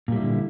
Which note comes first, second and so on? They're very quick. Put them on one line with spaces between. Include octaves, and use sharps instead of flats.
A#2 G3 E4 D3